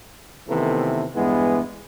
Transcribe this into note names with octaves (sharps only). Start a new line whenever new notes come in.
C3 D#3 E3 A3 B3 A4
E2 G2 E3 G#3 B3